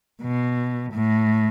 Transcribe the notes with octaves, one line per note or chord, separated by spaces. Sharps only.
B2
A2